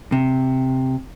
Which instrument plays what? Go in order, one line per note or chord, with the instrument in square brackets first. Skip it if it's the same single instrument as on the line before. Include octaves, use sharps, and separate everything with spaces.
[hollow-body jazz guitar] C3